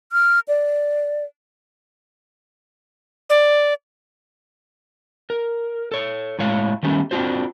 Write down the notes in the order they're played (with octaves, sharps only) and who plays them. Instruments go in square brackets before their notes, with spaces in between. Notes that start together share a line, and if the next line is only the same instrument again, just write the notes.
[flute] F6
D5
[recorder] D5
[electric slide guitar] A#4
A4 C#5
A2 G#3 C#5 F5
D#3 F#3 G3 A3 B3 C#4
C4 D4 F4 F#4 C5